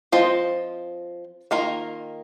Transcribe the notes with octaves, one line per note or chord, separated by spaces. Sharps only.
F3 C4 F4 C5 D#5
D#3 A#3 F4 A#4